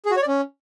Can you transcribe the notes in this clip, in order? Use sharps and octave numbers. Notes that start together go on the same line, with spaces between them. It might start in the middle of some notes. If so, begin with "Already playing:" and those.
G#4
F#4
C#5
D5
C#4